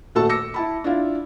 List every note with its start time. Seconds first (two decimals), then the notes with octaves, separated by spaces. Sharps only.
0.15 D#1 A3 F#4 A4 A5
0.29 D6 E6 A#6 C#7
0.54 E4 A5 B5
0.84 D4 E4 F4